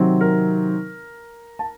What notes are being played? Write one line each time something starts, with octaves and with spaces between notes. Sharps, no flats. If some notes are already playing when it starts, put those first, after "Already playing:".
Already playing: C3 D#3 F#3 C4
A#4
A5